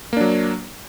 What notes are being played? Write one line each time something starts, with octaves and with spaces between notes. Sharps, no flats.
F#3 A#3 D4